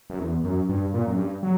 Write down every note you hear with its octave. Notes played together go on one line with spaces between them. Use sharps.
F#2
E2
F#2
G2
A#2
F#2
G2
F#3